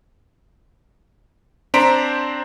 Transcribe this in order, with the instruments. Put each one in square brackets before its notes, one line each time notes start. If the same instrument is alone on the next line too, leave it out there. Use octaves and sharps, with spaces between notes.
[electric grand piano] C4 D4 C5 A#5 B6 D7